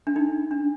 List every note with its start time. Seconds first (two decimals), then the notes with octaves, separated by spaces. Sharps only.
0.07 D4
0.16 D#4
0.51 D4